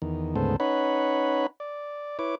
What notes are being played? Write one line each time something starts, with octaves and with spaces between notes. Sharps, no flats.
E2 D#3
D2 G#2 C#3 B3 A4 C5
C#4 D#4 B4 C#5 F#5 B5
D5
E4 B4 C#5 D6